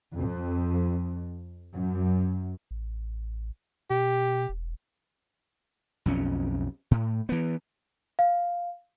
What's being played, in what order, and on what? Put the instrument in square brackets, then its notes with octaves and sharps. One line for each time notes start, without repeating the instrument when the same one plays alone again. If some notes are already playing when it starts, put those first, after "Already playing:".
[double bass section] F2
F#2
[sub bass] A1
[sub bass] B2 [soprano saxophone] G4
[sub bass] E1
[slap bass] B1 F2 C#4
A2
E3 B3
[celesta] F5